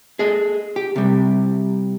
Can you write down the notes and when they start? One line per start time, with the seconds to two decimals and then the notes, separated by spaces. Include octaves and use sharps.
0.19 G#4 A4 D#5
0.76 G4
0.96 C3 G3